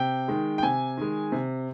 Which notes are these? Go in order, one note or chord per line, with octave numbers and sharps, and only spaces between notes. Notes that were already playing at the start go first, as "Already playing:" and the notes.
Already playing: C3 G5
D#3 G#3
G5
C3 G#5
D#3 G#3
C3